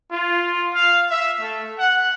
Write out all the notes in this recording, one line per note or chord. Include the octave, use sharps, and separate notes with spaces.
F4
F5
E5
A3
F#5